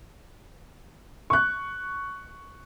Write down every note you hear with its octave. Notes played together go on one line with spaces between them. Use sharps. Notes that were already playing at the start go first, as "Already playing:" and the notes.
C#6 F#6